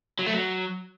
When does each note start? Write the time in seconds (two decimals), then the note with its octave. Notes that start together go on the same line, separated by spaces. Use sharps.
0.19 F#3
0.26 A3
0.34 F#3